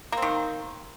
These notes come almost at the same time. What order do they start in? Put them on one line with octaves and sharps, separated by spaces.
A#3 C4 D#3